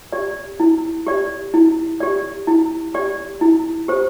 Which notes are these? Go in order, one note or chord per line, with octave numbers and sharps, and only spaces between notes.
G4 D5
E4
G4 D5
E4
G4 D5
E4
G4 D5
E4
G4 C5